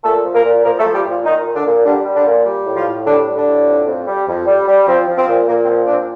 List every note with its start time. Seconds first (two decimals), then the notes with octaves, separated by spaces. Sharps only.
0.03 A#2 A3 A4
0.23 F3
0.34 A#3 A#4
0.44 A#2
0.64 F3 A#3 A#4
0.79 A3 A4
0.84 F3
0.94 G3 G4
1.05 A#2 F3 F4
1.25 A#2 D#3 D#4
1.44 A#2
1.55 D3 D4
1.65 A#2
1.85 D3 G3 D4
2.05 G3
2.15 D3 D4
2.26 A#2
2.46 G3
2.66 A2
2.76 F3 F4
2.87 A2
3.06 D3 G3 D4
3.26 G3
3.36 D3 D4
3.46 A2
3.66 F2
3.87 F2
4.07 G3
4.27 F2
4.47 G3
4.67 G3
4.87 F3 C4
5.07 F3
5.17 C4
5.27 A#2
5.48 A#2 A#3
5.64 C4
5.69 F3
5.86 A#2 D4
5.93 C4